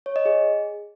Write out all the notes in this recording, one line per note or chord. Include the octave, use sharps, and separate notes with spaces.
C#5
D#5
G#4